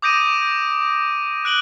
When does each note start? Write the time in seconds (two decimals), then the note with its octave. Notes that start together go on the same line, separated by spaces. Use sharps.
0.02 D6 D#6 G6 A#6 D7 D#7
1.45 F#6 D7 F#7 G7